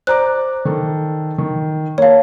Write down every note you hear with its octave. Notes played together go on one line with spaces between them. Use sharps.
C5 D5 A#5 D6 F#6
D#3 A4
D#3
A#3 C#5 F5 A5